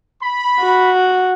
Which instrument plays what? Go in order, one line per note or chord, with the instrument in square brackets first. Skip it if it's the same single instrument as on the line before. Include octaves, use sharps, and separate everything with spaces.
[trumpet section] B5
[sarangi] F#4